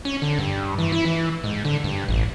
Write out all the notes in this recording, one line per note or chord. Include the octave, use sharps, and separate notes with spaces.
C#4
D3
G2
E3
E4
E3
G#2
D3
G2
A1